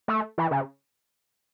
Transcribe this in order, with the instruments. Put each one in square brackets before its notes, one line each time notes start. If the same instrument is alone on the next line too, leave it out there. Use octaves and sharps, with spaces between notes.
[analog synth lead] A3
E3
C#3